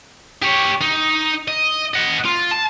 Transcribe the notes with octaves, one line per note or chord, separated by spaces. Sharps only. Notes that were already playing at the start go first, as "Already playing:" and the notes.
G4 C#5
D#4
D#5
D#5 F#5
F4
A5